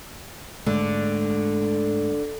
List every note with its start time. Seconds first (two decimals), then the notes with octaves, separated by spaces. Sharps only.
0.67 G#2 D3 G#3 A3